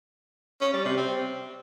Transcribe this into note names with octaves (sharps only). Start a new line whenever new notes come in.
C#4
G3
C3
C4